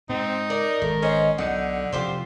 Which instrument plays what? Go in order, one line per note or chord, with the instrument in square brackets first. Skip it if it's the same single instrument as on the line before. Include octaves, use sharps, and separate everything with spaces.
[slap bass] G#2 [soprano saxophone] C4 [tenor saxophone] D#4
[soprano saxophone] A#4 [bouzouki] D5
[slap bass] G#1 [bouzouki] A3
[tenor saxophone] C#4 [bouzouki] C5 D#5
[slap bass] B1 B2 [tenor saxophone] D3 [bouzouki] D#4 [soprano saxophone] F#5
[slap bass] F1 [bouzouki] F4 G4 C5